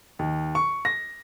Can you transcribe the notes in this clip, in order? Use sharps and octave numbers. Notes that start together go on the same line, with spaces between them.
D#2
C#6
A#6